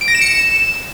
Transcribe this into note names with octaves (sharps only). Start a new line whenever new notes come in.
D7
A#6
E7
C#7
E7